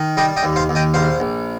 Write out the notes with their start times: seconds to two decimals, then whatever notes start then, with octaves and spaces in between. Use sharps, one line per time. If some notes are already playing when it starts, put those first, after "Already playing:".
Already playing: D#3
0.17 G3 D#5 G5
0.37 D#5 G5
0.43 D#2
0.56 C5 F5
0.69 D#2
0.75 D#5 G5
0.94 A#1 C5 F5
1.20 A#1